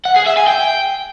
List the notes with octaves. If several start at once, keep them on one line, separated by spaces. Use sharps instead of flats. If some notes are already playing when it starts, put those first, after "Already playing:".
F#5
G#4
E5
G#5
G5